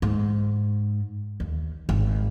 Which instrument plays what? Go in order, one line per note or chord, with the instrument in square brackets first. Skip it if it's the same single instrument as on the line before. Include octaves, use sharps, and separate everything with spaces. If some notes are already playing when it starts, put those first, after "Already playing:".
[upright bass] G#2
D#2
G#1